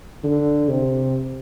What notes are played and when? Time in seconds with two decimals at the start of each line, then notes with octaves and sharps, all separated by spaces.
0.24 D3
0.69 C3